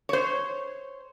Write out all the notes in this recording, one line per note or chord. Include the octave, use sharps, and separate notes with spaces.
C5 C#5